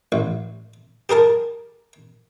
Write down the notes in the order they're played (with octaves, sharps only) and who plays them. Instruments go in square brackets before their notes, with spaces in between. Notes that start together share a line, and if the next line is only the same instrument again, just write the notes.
[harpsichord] A1
G4 G#4 A#4 A5